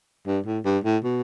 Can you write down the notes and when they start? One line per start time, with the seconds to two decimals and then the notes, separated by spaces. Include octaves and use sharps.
0.26 G2
0.46 A2
0.65 G2
0.84 A2
1.04 B2